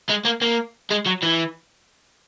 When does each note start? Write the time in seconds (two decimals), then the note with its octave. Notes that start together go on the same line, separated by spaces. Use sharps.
0.10 G#3
0.25 A#3
0.42 A#3
0.91 G#3
1.06 F#3
1.23 E3